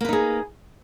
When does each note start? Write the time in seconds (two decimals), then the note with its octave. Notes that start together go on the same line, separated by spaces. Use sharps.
0.01 A#3
0.05 B4
0.09 D#4
0.13 G#4